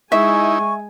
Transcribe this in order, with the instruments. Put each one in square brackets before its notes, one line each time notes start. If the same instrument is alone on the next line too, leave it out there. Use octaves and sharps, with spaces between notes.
[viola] G#3 G#5 [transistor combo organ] D#4 E4 [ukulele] E5 [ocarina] C#6